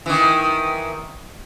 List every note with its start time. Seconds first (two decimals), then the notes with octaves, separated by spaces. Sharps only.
0.06 D#3 E3